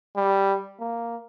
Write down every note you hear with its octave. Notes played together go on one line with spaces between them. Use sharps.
G3
A#3